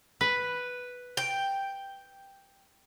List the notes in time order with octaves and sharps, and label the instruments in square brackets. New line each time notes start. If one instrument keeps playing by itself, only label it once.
[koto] B4
[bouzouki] G5